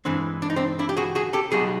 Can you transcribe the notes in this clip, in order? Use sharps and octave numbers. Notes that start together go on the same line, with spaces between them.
G2 E3 G#3 C4 D4
D4
D#4
C4 D4
D4 E4
G4
F#4 G#4
F#4 G#4
G4 A4
B1 B2 G3 F#4 G#4